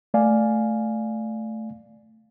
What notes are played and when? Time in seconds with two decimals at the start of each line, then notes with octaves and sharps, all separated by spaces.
0.14 A3 D5 F5 G#5